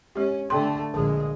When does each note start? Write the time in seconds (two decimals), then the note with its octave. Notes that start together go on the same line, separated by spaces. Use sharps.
0.16 G#3 C#4 G4
0.50 D3 A3 G5 C6
0.94 A#1 D3 G#3 G#4